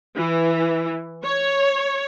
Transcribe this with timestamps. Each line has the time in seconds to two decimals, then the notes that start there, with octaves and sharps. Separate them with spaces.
0.17 E3
1.24 C#5